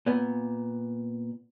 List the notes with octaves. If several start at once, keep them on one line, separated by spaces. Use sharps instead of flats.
A#2 B3